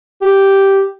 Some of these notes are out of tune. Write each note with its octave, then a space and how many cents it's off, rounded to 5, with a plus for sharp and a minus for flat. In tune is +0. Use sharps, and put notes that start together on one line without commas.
G4 -5